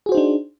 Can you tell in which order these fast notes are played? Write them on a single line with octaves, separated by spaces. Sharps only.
G#4 F#4 C5 D#4 D4